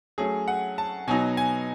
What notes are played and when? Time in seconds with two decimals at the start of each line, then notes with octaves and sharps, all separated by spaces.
0.18 F#3 A3 C#4 G#4
0.48 F#5
0.78 A5
1.07 B2 F#3 B3 D#4 G#5
1.37 G#5